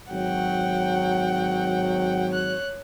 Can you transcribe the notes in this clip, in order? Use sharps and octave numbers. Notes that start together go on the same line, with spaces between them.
G#1 F#3 F#5 G5
C#5 F#6